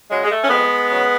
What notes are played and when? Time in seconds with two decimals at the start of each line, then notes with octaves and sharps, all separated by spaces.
0.10 C#3 F#3 G#3
0.24 G#3
0.30 A3
0.44 C#4
0.49 F2 G#3 B3
0.88 C#3 F#3